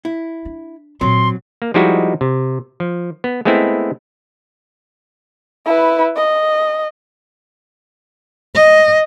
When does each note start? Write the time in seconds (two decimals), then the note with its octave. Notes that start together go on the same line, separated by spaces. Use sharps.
0.05 E4
0.45 D4
1.01 A#2 D#3 F#3 C4 C6
1.62 A#3
1.74 F3 G3 G#3 D#4 E4 F#4
2.21 C3
2.80 F3
3.24 B3
3.45 G#3 A3 B3 C4 E4
5.66 E4 B4
6.16 D#5
8.55 D#5